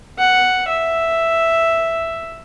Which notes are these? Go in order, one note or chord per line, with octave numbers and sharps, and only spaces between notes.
F#5
E5